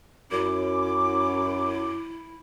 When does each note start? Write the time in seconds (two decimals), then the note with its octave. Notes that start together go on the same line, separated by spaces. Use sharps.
0.31 F#2 C#4 E4 D6